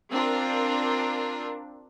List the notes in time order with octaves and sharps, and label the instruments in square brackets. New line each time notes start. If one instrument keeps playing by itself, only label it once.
[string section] C4 D4 F4 A#4